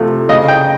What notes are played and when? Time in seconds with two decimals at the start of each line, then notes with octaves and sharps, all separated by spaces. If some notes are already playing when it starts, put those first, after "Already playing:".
Already playing: C3 F3 A3
0.29 C#3 D#5
0.48 G5